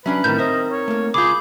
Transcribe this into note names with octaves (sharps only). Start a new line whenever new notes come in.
F#3 C#4 D4 B4 E5
A2 D#3 C4 D#4 A#4 G6
C5 D#5 E5
C#5
A3 A#3
C#2 F4 G#4 B5 D6 G6